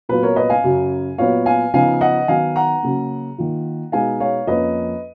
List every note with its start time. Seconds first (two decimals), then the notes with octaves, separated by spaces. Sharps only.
0.09 A#2 F#3 B3 F4 B4
0.23 A#4 C#5
0.36 B4 D#5
0.50 F5 G#5
0.64 F#2 C#3 F#3
1.18 A#2 F#3 B3 C#5 F5
1.46 F5 G#5
1.74 C#3 F3 B3 D#4 F5 G#5
2.01 D#5 F#5
2.28 D#3 F#3 B3 D#4 F5 G#5
2.56 F#5 A#5
2.83 C#3 F#3 A#3
3.38 D#3 A#3 F4
3.92 B2 G#3 B3 D#4 F5 G#5
4.20 C#5 F5
4.47 F2 F3 A#3 C#4 B4 D#5